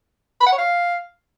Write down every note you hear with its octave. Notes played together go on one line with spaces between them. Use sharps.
B5
F#5
C#5
F5